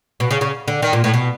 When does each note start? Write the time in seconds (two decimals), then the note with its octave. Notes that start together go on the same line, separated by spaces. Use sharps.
0.20 B2
0.31 C#3
0.41 C#3
0.68 D3
0.82 D#3
0.93 A#2
1.04 A2
1.14 B2